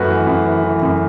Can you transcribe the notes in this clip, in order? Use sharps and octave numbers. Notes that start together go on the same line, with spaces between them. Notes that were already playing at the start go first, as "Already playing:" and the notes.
Already playing: F#2 A3 F#4 B4
E3
F#2
E3
E3
F#2